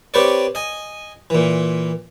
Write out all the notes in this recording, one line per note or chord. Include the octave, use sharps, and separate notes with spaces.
C4 G4 B4 C#5 D5
D#5 G#5
A#2 E3